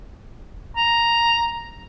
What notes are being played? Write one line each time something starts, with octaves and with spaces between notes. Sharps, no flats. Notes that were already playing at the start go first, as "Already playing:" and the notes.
A#5